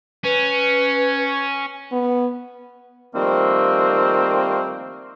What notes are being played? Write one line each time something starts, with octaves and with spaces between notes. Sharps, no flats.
C#4 B4
B3
D#3 F3 G3 A3 A#3 C4